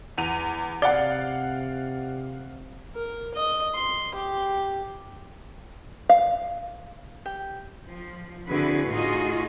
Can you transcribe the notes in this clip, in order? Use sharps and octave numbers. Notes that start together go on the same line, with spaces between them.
E2 D#7 F7
C3 D5 F5 F#5 A6 G7
A#4
D#5
C6
G4
F5
G4
F3
D3 C4 E4 F#4 G#4 B4
A2 D#4 F4 F#4 G#4 D#5